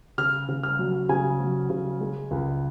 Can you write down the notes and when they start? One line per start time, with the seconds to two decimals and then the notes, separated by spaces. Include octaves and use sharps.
0.18 C#3 F6
0.48 C#3
0.63 F6
0.79 F#3
1.09 C#3 G#5
1.40 F#3
1.70 C#3
2.00 G#3
2.31 C#2